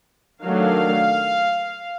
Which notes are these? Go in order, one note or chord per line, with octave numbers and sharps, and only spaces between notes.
D#3 F#3 A3 D4 F5